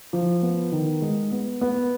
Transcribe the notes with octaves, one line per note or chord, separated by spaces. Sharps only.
F3
B3
D#3
G#3
B3
B3